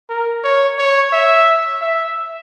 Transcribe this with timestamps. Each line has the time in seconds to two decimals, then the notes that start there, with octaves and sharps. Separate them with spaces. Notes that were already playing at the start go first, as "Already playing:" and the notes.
0.10 A#4
0.44 C#5
0.78 C#5
1.13 E5
1.81 E5